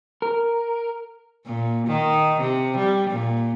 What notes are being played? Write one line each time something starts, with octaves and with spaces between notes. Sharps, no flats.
A#4
A#2
D#3
C3
G3
A#2